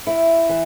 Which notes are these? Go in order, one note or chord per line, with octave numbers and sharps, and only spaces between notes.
E4
E3